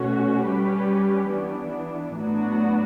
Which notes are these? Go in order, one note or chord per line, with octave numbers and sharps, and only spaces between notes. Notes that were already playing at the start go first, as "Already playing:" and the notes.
Already playing: B2 A3 C#4 F#4
G3 C#4 G4 B4
E3 B3 D4
A2 F#3 B3 D4 F#4